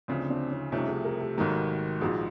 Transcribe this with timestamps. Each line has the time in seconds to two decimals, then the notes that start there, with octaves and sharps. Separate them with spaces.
0.08 D2 C#3 F3 C4 D4
0.30 C4 D4
0.51 C#4 D#4
0.72 C2 C3 F3 A3 C#4 D#4
0.88 F#4 G#4
1.04 G#4 A#4
1.20 G4 A4
1.37 G#1 G#2 D#3 F#3
2.00 A#1 G#2 F3 F#4 G#4